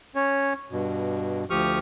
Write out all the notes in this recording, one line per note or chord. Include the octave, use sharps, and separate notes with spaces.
C#4 C#5
G2 B2
D2 F3 G4 C#6 D#6 F6